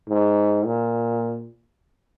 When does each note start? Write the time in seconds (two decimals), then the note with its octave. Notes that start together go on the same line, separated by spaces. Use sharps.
0.09 G#2
0.66 A#2